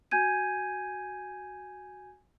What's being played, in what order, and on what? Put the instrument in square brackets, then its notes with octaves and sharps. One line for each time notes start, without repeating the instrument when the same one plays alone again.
[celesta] F#4 G#5 G6 G#6 D#7